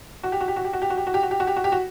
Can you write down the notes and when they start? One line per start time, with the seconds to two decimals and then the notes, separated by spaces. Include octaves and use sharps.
0.23 F#4
0.32 G4
0.41 F#4
0.48 G4
0.56 F#4
0.65 G4
0.73 F#4
0.82 G4
0.90 F#4
0.97 G4
1.07 F#4
1.14 G4
1.23 F#4
1.31 G4
1.40 F#4
1.47 G4
1.56 F#4
1.64 G4
1.72 F#4